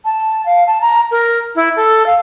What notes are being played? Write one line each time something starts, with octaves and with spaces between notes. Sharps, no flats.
A5
F5
A5
A#5
A#4
E4
A4
F5